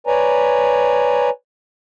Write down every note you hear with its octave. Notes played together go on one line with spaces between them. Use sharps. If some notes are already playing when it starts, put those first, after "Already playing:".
B4 C#5 D5 G#5 A#5